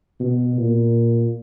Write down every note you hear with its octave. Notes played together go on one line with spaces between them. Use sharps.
B2
A#2